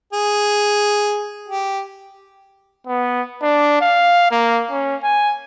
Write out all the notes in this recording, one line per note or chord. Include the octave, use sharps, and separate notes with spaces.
G#4
G4
B3
D4
F5
A#3
C#4
G#5